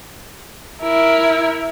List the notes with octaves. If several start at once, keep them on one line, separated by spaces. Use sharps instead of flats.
E4 A#4